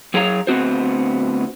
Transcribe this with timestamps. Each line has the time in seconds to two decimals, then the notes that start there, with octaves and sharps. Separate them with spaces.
0.14 F#3 G#4 C#5 F5 A#5
0.47 D2 B3 C4 F#4 C5